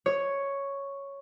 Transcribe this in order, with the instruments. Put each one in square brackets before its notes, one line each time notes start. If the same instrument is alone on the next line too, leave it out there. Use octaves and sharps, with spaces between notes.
[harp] C#5